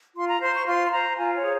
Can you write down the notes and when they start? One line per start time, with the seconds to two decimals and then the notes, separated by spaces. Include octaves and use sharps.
0.16 F4 C6
0.28 A#5
0.41 C5 C6
0.54 C#6
0.67 F4 C6
0.87 C6
0.92 C5 A#5
1.17 F4 G#5
1.34 C#5
1.43 G#4 C5